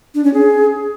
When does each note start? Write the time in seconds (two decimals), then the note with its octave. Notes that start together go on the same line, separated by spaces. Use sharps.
0.14 D4
0.24 C#4
0.34 G#4